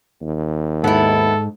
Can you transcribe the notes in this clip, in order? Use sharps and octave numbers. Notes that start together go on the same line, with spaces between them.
D#2
G#2 B3 E4 A4